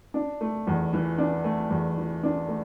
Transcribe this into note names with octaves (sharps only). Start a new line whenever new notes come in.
D4
A3
E2
E3
D4
A3
E2
E3
D4
A3